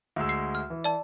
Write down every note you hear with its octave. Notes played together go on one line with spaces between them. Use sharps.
D2 G#3 E6
C7
F6
E3
D5 A5